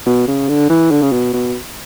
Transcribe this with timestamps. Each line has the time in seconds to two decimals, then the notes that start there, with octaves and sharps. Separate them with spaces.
0.06 B2
0.28 C#3
0.49 D3
0.69 E3
0.91 D3
1.02 C#3
1.12 B2
1.34 B2